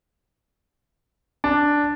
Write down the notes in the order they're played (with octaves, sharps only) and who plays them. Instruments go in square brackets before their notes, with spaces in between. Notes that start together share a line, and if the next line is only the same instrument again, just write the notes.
[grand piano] D4